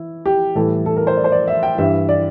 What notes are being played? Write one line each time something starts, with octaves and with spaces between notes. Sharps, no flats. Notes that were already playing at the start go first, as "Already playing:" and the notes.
Already playing: E3 E4
G4
A2 E3 G3 A4
A4
A#4
C5
D5
C5
D5
E5
G5
G2 E3 G3 E5
D5